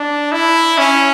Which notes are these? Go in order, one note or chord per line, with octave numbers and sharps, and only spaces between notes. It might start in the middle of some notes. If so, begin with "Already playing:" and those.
Already playing: D4
E4
C#4